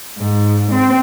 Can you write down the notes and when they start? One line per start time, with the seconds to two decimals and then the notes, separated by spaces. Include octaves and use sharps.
0.17 G#2
0.71 C4